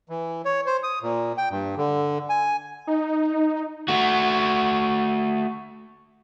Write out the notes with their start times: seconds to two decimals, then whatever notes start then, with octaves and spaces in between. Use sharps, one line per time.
0.09 E3
0.45 C#5
0.66 C5
0.83 D#6
1.02 A#2
1.38 G5
1.50 G2
1.77 D3
2.29 G#5
2.87 D#4
3.88 A3 F#4